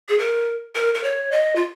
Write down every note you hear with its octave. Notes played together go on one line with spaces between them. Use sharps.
G#4
A#4
A#4
A#4
C#5
D#5
F4